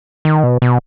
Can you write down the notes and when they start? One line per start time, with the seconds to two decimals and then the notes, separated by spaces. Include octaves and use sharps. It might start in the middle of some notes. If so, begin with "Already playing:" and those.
0.25 D#3
0.43 B2
0.62 B2